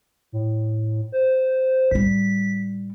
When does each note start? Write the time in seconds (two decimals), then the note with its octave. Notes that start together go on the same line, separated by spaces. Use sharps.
0.32 A2
1.12 C5
1.91 A2 G3 B6